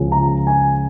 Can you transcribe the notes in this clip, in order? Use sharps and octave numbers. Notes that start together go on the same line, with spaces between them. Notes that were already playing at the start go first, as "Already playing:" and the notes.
Already playing: C#2 C#3 F3 C#4
A#5
G#5